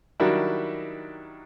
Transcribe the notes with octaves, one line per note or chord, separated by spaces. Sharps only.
D#3 F#3 G3 D4 E4 F#4